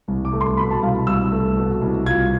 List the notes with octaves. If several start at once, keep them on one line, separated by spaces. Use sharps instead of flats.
C2
D6
A3
C6
B2 B5
A5
C2 F5
C2 E6
A3
B2
C2
F4 G#6